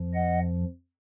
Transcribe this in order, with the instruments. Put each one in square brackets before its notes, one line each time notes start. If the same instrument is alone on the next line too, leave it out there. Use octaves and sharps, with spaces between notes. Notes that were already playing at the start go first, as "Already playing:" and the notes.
Already playing: [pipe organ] F2 F3
D#5 F#5